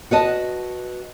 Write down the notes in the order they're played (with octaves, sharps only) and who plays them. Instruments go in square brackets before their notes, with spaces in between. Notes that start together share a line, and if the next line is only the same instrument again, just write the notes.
[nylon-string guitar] F#4 B4 D#5 A5